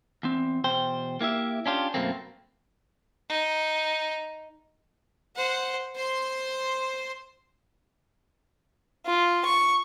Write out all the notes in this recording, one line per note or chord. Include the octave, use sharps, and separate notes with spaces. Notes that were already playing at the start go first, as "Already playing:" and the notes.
E2 C4
E2 B2 C5 G5
A#3 E4 G4 E5
C#4 D4 F4 G4
F#2 B2 A3 A#3 C4
D#4
C5 F#5
C5 C6
F4
C#6